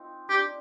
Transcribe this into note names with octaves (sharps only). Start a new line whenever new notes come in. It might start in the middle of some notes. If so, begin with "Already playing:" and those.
Already playing: C4 D#4 F4
D4 G4